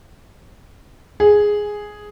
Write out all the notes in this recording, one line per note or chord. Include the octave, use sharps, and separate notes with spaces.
G#4